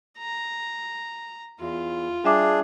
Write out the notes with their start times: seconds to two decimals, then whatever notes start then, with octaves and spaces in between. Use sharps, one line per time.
0.18 A#5
1.60 E2 F4
2.24 G3 D4 G#4 E5 D6